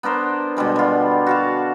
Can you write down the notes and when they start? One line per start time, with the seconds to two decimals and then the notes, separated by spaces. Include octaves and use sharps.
0.03 B3 D4 A#4 C5
0.57 B2 D3 G3 G#3
0.76 G3 F4
1.26 F#4 F5 A5